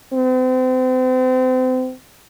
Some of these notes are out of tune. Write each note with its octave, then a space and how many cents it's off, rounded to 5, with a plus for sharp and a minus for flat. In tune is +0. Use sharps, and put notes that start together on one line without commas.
C4 -35